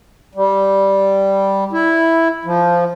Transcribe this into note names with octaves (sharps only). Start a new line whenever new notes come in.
G3
E4
F3